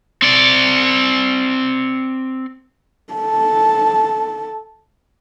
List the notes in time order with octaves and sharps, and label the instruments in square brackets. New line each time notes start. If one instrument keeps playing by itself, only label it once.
[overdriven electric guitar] C4 D5
[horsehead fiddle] A4 A5